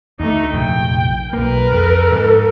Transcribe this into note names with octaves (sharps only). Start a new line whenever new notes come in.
D2 A3 D#4
F1 A#1 F3 G5
B1 A#3 A#4 B4
F2 A4
G#2